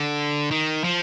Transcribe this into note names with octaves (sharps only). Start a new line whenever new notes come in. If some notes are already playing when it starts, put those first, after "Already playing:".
Already playing: D3
D#3
F3